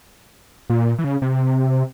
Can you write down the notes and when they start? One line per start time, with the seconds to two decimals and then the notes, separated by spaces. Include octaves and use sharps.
0.70 A#2
0.98 E3
1.04 C#3
1.22 C3